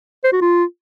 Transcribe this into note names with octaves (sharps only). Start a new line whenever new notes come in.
C5
F#4
F4